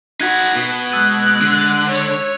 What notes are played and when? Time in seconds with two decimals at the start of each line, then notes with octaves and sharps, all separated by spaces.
0.21 D#4 F#4 F#6 G#6 B6
0.56 B2
0.92 G#3 E6 F#6 A6 D#7
1.41 D3
1.89 C#5